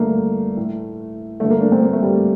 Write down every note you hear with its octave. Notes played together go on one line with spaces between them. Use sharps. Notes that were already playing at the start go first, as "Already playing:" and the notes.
Already playing: G2 D3 A3 A#3
A2
G2 D3 A3
A#3
D4
C4
A#3
A3
G3